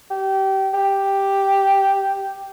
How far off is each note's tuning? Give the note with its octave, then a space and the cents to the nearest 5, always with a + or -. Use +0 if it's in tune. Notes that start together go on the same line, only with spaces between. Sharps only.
G4 -25
G4 +0